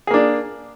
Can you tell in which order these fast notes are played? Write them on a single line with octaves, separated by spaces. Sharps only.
G#4 A#3 D4